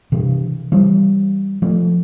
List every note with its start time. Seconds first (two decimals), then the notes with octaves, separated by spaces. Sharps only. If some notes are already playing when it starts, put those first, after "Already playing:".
0.12 C3 E3
0.72 E3 G3
1.62 F3 A3